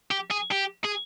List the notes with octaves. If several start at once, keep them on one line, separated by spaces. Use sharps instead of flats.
G4
G#4
G4
G#4